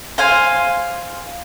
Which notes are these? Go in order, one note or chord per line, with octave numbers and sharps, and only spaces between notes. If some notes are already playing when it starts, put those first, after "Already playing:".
C5 F5 G#5